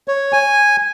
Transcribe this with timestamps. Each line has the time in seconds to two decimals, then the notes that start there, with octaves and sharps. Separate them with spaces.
0.08 C#5
0.33 G#5